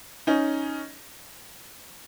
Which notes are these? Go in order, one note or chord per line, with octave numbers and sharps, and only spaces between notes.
C#4 D#4